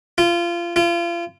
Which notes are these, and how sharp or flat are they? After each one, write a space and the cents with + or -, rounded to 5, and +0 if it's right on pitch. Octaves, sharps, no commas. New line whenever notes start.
F4 -25
F4 -35